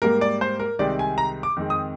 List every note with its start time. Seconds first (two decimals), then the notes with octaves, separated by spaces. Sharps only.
0.02 G#2 G3 A#3 A#4
0.21 D5
0.41 C5
0.60 A#4
0.79 C2 C3 D#3 G#3 C4 D5
0.99 G#5
1.18 A#5
1.43 D6
1.56 F2 D#3 G#3 C4
1.70 D#6